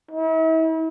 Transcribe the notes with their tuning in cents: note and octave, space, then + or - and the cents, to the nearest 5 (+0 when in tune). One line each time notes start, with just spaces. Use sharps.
E4 -40